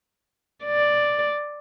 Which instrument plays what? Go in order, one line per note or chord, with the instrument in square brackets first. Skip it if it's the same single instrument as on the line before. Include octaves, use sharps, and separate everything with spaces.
[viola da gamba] D5